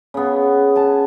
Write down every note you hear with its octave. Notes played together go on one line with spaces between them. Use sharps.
C#3 B3
G#5 A5